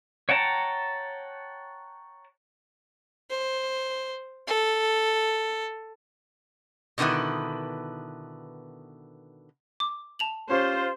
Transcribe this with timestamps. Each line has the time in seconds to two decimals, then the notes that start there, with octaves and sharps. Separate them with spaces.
0.29 C#5 F#5 G5 A5 A#5
3.30 C5
4.47 A4
6.98 B2 D3 D#3 B3 E4
9.80 D6
10.19 A5 F7 F#7
10.50 C#4 F4 G4 C5